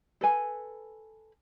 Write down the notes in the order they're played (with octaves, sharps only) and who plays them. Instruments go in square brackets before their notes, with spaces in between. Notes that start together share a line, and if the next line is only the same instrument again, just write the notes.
[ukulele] A4 B4 G#5